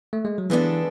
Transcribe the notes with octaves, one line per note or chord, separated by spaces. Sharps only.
A3
G#3
F#3
C#3 E3 G#3 B3 D4 A4